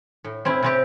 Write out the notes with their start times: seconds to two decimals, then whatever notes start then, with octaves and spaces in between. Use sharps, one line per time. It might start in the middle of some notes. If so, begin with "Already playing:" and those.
0.24 A2
0.45 C4 C#4 E4
0.63 C3 C4 G4